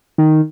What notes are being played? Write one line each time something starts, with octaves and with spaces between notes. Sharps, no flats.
D#3